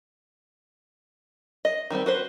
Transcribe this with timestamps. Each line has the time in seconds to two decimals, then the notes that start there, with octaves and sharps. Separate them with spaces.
1.65 D#5
1.90 D#3 G3 C4 G4
2.06 F#4 B4 C5